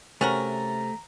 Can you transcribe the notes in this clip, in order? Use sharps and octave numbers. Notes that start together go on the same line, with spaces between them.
C3 A3 C#4 F#4 A#4 A#5